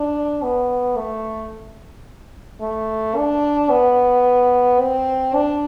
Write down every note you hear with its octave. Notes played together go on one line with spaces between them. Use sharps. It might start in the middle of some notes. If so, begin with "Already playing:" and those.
Already playing: D4
B3
A3
A3
D4
B3
C4
D4